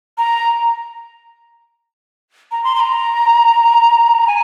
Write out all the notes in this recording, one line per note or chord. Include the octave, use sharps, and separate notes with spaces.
A#5
A#5
C6
C6
A#5
G#5